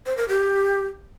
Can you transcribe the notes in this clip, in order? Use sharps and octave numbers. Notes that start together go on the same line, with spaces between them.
C5
A#4
G4